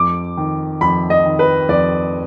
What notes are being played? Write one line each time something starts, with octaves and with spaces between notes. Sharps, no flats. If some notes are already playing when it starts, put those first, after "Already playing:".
Already playing: F2 D6
D#3
F2 B5
D#5
D#3
B4
F2 D5